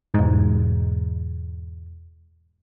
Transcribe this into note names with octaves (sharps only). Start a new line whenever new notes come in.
E1 G#2